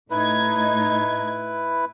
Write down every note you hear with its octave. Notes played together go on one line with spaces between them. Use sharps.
A2 D#4 E4 B4 G#6